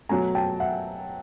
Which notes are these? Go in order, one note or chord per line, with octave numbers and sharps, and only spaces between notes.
B2 F#3 A3 G#5 A#5
G5 A5
E5 F#5